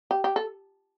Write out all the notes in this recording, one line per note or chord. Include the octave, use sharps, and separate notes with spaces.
G4
G4
A4